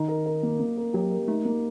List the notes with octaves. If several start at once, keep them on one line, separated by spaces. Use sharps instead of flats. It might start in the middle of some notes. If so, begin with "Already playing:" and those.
Already playing: D#3 D#4
A#4
A#4
A#3
A#3
A#4
F#3 G4
A#4
A3 D#4
A#3